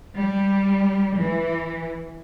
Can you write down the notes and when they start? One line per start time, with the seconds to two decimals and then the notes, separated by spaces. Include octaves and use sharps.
0.20 G3
1.22 E3